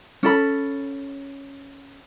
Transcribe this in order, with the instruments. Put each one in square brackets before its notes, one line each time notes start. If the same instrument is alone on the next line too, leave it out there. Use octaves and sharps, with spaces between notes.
[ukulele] C#4 A4 B5